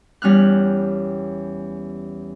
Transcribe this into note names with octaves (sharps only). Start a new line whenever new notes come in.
E2 G3 C#4 F6 F#6